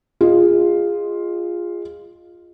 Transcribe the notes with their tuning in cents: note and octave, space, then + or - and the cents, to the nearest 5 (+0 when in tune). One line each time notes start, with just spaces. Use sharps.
F4 +0 G#4 -20 D#5 +0